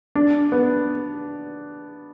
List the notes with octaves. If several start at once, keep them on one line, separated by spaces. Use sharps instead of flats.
D4
B3